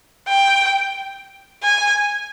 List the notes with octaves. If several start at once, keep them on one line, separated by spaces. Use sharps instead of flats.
G5
G#5